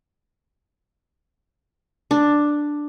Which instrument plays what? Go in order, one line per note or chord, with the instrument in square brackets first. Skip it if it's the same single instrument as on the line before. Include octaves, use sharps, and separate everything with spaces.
[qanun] D4